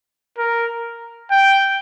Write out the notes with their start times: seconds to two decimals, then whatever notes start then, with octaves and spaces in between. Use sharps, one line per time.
0.38 A#4
1.31 G5